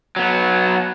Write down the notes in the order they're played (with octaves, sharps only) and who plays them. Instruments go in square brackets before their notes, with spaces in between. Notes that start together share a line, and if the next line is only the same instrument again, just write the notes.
[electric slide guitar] F#3 B3